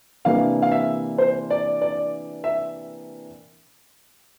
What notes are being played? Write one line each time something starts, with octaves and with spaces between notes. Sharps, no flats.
C3 E3 A#3 D4 F5
F5
E5
C5
D5
D5
E5